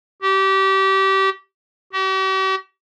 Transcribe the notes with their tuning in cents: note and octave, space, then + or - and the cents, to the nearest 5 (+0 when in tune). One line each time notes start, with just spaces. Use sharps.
G4 -25
G4 -45